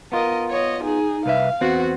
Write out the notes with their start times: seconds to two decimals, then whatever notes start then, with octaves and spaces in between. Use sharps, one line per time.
0.12 B3 F4 A#4 D#5
0.51 C#5 D#5
0.83 D#4 G#4
1.26 C2 B4 E5 F5
1.61 E2 B3 C4 F#4